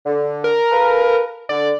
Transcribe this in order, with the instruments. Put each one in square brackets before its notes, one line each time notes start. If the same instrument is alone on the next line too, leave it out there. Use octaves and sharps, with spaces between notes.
[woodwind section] D3
[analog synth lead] A#4
[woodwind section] F4 A4 B4
[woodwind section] D3 [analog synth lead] D5